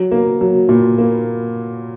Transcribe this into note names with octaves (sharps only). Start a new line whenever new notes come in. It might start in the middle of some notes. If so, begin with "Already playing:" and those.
Already playing: F#3
A#3
F#3
A#2
A#3